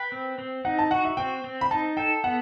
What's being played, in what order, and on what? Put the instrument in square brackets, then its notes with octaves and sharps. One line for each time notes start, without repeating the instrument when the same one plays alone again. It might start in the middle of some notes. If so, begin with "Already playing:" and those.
Already playing: [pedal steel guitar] B4 [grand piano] G5
[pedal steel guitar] C4
C4
[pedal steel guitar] D#4 [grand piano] F#5
[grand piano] A5
[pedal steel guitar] F#4 [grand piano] F#5
[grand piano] E5
[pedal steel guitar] C4 [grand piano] G5
[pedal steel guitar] C4
[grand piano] B5
[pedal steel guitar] D#4 [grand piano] A5
[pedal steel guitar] A4 [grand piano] G5
[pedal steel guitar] B3 [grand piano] F#5